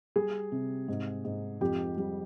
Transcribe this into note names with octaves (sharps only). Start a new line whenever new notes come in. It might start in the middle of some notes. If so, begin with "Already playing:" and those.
G3 G#4
C3
G#2
G#2
F2 G4
G3